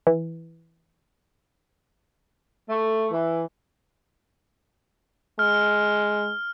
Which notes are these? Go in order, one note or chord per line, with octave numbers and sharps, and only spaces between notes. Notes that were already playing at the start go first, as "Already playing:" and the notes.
E3
A3
E3
G#3 F6